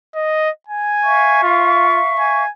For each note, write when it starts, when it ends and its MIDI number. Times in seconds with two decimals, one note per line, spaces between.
0.15 0.50 75
0.68 1.39 80
1.04 2.45 76
1.04 2.45 77
1.04 2.45 85
1.43 2.00 65
2.19 2.50 80